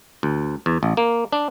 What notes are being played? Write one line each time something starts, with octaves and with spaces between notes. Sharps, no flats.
D2
E2
A1
A#3
D4